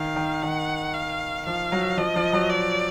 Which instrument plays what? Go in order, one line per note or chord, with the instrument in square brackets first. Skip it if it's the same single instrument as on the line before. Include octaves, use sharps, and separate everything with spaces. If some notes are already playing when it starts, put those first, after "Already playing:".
Already playing: [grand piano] D#3 [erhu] F5
[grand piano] D#3
[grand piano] D#3 [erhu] F#5
[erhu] F5
[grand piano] F3 [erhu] F5
[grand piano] F#3
[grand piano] F3 [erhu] D#5
[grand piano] F3
F#3
[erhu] D5